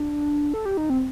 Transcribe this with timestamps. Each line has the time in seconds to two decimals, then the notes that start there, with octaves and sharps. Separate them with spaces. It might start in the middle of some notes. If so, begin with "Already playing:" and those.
Already playing: D4
0.54 A4
0.65 G4
0.77 D#4
0.90 C4